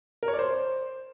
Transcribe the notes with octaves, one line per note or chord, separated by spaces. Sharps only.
A#4
C#5
D5
C5